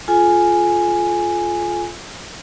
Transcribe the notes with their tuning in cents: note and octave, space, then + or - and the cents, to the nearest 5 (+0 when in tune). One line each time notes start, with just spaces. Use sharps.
F4 +0 A4 -45 G#5 +0